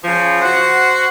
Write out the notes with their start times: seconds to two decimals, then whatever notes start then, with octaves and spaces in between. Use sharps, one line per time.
0.04 C#3 F3
0.41 F#4 C5 F#5